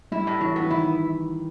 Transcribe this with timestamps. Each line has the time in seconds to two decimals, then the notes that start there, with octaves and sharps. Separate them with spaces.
0.12 G3 E4
0.27 A2
0.41 E3 F#3
0.56 E3 B3
0.70 D#3 E4